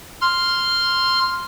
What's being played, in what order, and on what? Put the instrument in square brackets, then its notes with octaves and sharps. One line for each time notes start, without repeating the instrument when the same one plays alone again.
[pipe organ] C6 F6